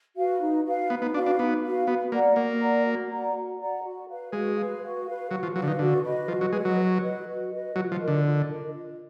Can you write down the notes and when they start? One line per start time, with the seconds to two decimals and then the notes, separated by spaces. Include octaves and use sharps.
0.17 F#4 B4 F5
0.41 D#4
0.65 F#4 B4 F5
0.90 B3 D#4
1.02 B3
1.14 D4 F#4 B4 F5
1.26 D4
1.39 B3 D#4
1.64 F#4 B4 F5
1.87 B3 F#4
2.12 A#3 D5 F#5 A#5
2.36 A#3 F#4
2.61 D5 F#5 A#5
2.86 F#4
3.10 D5 F#5 A#5
3.35 F#4
3.60 D5 F#5 A#5
3.84 F#4
4.08 B4 F5
4.33 G#3 F#4
4.57 B4 F5
4.82 F#4
5.06 B4 F5
5.31 F#3 F#4
5.43 F3
5.54 F#3 B4 F5
5.62 D3
5.67 D#3
5.79 D3 F#4
6.03 B4 D#5
6.28 F3 F#4
6.41 F#3
6.52 G#3 B4 D#5
6.65 F#3
6.78 F#4
7.03 B4 D#5
7.27 F#4
7.52 B4 D#5
7.75 F#3 F4
7.92 F3
8.00 A#4 D#5
8.08 D3
8.25 F4
8.49 A#4 D#5
8.74 F4